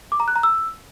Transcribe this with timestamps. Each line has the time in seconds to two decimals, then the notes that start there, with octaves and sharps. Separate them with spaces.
0.12 D6
0.20 A#5
0.28 F#6
0.36 A#5
0.43 E6